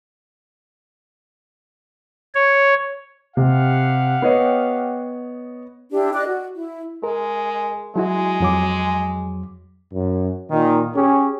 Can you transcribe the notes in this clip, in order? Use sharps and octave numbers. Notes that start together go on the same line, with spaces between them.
C#5
C3 G4 F5 F#5
B3 C#5 D#5
D4 E4 G4
D5 D#5 D6 F#6
F#4
E4
G#3 A#4
F#3 G#3 E4 F#4
F2 F#3 D6
F#2
A#2 D#3
C#4 G4 G#4